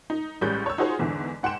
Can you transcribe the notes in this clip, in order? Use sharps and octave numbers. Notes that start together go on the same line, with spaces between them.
D#4
A1 G3 G#3 C#4 F#6 G6
C#5 E6
D#4 F4 F#4 G#4 C5 C#5
E2 G#2 D3 E3
G#2 F#5 G5 C6 E7